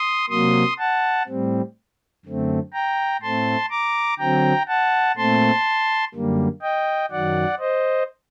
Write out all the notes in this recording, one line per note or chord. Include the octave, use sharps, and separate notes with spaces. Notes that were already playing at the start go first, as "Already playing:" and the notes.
Already playing: C6 D#6
C3 F#3 A#3 C6 D#6
F#5 A5
A2 G3 C4
F#2 D3 A3 C4
G5 A#5
A2 A3 C4 A5 C6
A#5 D6
D3 F#3 C4 G5 A#5
F#5 A5
A#2 A3 C4 A5 C6
F#2 D3 G3 A#3
D#5 G5
F#2 D#3 F#3 D5 F#5
C5 D#5